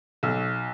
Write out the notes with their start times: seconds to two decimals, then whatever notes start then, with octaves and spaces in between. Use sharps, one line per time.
0.23 B1